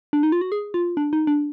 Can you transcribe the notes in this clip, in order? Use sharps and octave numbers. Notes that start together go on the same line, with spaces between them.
D4
D#4
F4
F#4
G#4
F4
D4
D#4
D4